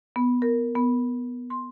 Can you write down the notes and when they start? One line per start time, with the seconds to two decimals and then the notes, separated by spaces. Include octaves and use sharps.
0.16 B3
0.42 A#4
0.76 B3
1.50 C6